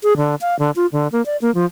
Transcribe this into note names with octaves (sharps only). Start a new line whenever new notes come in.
G#4
D3
F5
D3
F4
D3
A#3
D5
A#3
F3